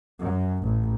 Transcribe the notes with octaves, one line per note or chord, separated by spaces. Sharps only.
F#2
A1